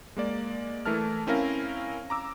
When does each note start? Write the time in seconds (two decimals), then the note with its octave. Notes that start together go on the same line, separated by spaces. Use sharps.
0.17 G#3 A#3 D5
0.85 E3 A3 E4 A#4 A5 F6
1.27 C4 C#4 E4 A#4 F5 A#6
2.10 A#5 D6 E6